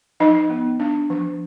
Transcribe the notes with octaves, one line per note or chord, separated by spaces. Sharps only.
F3 D#4 D#5
B3
D4
F3